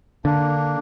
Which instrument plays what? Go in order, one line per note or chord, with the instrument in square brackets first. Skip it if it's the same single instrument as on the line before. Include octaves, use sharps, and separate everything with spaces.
[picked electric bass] D3 [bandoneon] A#3 D4